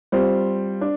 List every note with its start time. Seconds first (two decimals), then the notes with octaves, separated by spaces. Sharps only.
0.12 G3 C4 F4 C5
0.81 D4